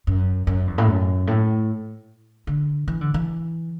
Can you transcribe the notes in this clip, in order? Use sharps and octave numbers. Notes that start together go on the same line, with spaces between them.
F#2
F#2
E2
A2
F#2
A2
D3
E3
D3
E3